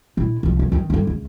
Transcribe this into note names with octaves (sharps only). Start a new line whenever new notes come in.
A#1 E4
C2 F3
D#3 E3
D#3 C4
G2 D3
C#2